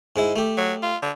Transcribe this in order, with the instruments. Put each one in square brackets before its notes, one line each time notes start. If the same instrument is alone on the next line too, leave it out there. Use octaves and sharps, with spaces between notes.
[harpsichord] G#2 G#3 E4
A3 G4
[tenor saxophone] F#3
F4
D3